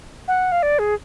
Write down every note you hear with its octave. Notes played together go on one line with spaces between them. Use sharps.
F#5
F5
D5
G#4